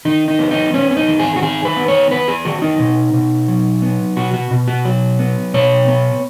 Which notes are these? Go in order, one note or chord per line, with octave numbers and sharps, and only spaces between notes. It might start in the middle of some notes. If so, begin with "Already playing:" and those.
D#3 D#4
D#4
B3
D#4
B3 C#4
C#4
D#4
D#3
G#4
F#4
D#3 G#4
B4
B3
C#5
B3 B4
G#4
D#3 F#4
D#4
B2
B2
F#3
B3
B2 F#4
F#4
B2
F#4
F#3
B3
B2 C#5
B3